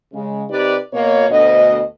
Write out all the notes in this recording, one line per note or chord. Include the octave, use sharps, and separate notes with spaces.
C#3 G#3
C3 D#4 G4 B4 D5
B2 A#3 C#5
D2 B2 D#5